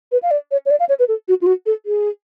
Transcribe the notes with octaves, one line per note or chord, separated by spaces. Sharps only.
B4
F5
D5
C#5
C#5
D5
F5
C#5
B4
A4
F#4
F4
F#4
A4
G#4